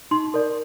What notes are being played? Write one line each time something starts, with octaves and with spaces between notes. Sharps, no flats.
D#4 C6
A#4 D5